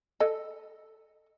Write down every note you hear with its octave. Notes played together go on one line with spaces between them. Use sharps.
A4 D#5